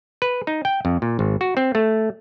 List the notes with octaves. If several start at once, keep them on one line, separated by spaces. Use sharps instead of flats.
B4
D#4
G5
F2
A#2
G#1
F#4
C4
A3